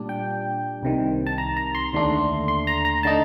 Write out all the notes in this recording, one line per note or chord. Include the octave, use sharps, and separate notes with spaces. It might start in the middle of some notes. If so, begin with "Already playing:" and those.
Already playing: A#2 G3 D4
G5
C2 C3 D#3
A5
A#5
A#5
C6
D#2 D3 A3 D4
C6
A#5
A#5
D3 A3 D#4 A5